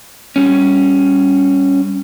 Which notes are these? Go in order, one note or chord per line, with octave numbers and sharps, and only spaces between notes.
G3 C#4